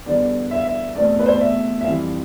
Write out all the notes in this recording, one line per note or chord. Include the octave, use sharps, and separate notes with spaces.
E2 D3 G3 B3 D5
E5
F5
E5
E2 B2 A3 C4 D5
B4
C5
D5
E5
E5
F2 E3 G3 F5